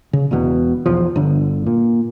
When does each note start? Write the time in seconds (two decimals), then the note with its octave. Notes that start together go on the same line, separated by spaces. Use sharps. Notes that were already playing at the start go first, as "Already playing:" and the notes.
0.13 C#3
0.31 E1 E2 B2 B3
0.86 B1 E2 F3
1.16 G1 D3
1.67 A#2